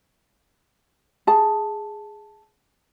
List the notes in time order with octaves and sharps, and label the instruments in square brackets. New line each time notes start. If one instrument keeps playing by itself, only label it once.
[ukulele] G#4 A5